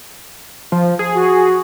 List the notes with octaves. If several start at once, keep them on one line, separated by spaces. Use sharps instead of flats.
F3
G#4
F#4